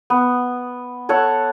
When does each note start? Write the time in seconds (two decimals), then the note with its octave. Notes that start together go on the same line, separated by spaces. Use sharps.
0.10 B3
1.09 A4 C#5 F#5